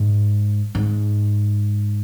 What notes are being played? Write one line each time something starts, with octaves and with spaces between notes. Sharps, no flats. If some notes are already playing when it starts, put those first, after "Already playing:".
Already playing: G#2
G#2